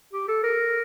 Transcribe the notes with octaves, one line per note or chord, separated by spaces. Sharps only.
G4
A4
A#4